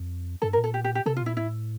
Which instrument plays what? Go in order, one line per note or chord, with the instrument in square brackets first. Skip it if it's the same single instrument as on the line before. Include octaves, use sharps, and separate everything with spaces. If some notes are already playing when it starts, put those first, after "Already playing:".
Already playing: [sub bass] F2
[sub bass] G2 [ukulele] A4
[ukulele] A#4
[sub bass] A#2
[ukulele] A4
G4
G4
G4
[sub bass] C3 [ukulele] A4
[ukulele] F4
[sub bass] A#2 [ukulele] E4
[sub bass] A2 [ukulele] E4